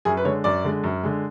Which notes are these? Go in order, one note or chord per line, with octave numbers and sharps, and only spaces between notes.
F#2 G#4
B4
D3 G#3 C#5
F#2 D5
D3 G#3
F#2
D3 G#3